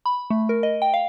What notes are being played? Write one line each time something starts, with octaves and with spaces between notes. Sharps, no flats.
B5
A3
A#4
D#5
G5
F5